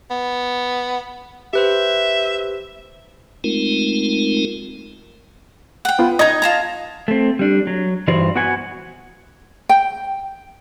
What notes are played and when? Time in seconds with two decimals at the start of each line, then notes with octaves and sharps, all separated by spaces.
0.11 B3
1.53 G4 B4 C5 E5
3.44 G#3 A3 C4 D#4 F4 A#4
5.85 F#5 G5
5.99 B3 F4 B4
6.19 D#4 D#5 A#5 G#6
6.42 F4 A5 A#5
7.08 A3 C4
7.39 G3 D4
7.67 F#3
8.08 G2 E3 D#4 F#4 C5 D5
8.35 B3 F#4 B4 F#5 G#5
9.69 G5